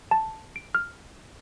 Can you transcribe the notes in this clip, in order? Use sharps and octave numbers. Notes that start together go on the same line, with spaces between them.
A5
D7
F6